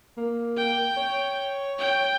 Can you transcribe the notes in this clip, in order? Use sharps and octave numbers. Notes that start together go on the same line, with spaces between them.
A#3
G5
C#5
G5